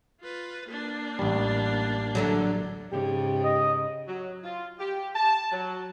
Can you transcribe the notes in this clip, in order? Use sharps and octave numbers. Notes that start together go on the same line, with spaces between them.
F4 B4
A#3 D4
A1 G3
D2 D3 F#3
G#2 C#3 G4
D#5
F#3
F4
G4
A5
F#3